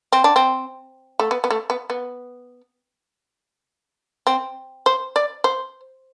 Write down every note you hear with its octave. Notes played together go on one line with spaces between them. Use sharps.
C4
D4
C4
A3
B3
B3
A3
B3
B3
C4
C5
D5
C5